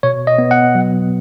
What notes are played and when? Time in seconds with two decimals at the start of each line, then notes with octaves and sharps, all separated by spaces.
0.03 B2 C#5
0.27 D#5
0.38 B3
0.51 F#5
0.75 F#3